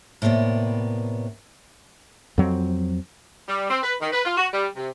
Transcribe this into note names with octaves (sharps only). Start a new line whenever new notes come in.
A2 C3 A#3 B3 D5
F2 F#3 C4
G3
C4
B4
D#3
B4
F4
F#4
G3
C3